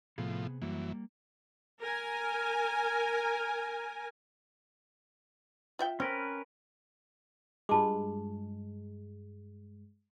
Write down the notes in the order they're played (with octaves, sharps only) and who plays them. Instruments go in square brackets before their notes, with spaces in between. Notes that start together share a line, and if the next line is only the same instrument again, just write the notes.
[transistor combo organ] A2 F3 [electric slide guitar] C3 B3 G#4
[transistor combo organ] F#2 E3 [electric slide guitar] G3 A#3
[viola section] A#4 G#5
[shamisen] F4 E5 G5
[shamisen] C4 [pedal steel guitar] C#4 A#4 B4
[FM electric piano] G2 G#3 [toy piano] F4 A5 D6